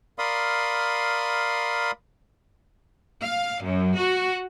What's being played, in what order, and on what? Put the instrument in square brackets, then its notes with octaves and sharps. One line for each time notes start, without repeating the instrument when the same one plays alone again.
[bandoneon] A#4 D5 F5 B5 C6 D#6
[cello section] F5
F#2
F#4